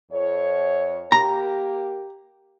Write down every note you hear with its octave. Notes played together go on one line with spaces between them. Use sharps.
F2 C#5
A#3 G4 A#5